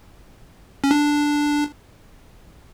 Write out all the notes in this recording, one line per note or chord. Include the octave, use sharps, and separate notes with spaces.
C#4
D4